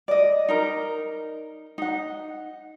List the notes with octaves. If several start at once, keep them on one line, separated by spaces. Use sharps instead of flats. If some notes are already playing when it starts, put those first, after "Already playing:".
D5 D#5
D#4 A#4 A#5
D#4 F#5